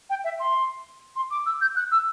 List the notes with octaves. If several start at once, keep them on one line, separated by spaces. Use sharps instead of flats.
G5
E5
C6
C6
D6
E6
G6
F#6
E6